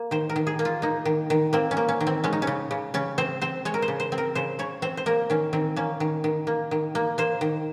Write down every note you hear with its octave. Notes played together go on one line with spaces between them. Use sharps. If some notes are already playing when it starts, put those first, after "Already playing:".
Already playing: A#3
D#3 C5
A#4
D#3
G#4
A#3
F4
A#3 D#4
D#3
D#3
A#3 C4
C#4
A#3
C#4
D#3
C4
G#3 C#4
D#4
C#4
C#3
C#3
C#3 C#4
C4 C5
C4 C5
G#3 C#5
A#4
C5
C#3
C5
C4
A#4
C#3 C5
C#3 C#5
C4 C5
C5
A#3 A#4
D#3 C#4
D#3 C4
A#3 C#4
D#3
D#3
A#3
D#3
A#3
A#3 C5
D#3